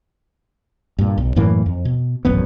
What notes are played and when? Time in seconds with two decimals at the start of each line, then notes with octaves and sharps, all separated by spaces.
0.98 G2 A#2
1.18 B1
1.36 F#2 A2 E3 A#3
1.66 F2
1.85 B2
2.25 D#1 A1 F#2 B3